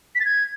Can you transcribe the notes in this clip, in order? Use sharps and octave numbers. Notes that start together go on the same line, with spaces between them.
B6
A6
G#6